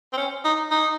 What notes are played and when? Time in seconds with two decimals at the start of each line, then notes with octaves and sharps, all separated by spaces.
0.13 C4
0.17 C#4
0.45 D#4
0.71 D#4